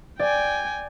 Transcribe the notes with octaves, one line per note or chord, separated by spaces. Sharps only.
D5 G5 G#5